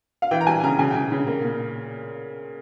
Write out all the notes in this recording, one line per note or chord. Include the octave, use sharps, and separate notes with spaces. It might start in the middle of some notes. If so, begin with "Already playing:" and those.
F5
E3 G5
A#5
G3 G#5
C#3 A#5
C#3 G#5
C#3 G5
C#3
A#3
A#2